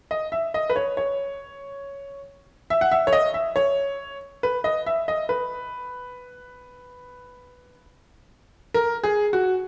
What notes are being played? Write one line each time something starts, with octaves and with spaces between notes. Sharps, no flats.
D#5
E5
D#5
B4
C#5
C#5
E5
F#5
E5
C#5
D#5
E5
C#5
B4
D#5
E5
D#5
B4
A#4
G#4
F#4